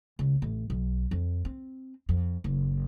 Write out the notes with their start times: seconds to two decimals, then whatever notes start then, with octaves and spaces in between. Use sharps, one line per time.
0.19 C#2
0.42 A1
0.70 B1
1.11 F2
1.45 C4
2.09 F2
2.44 F#1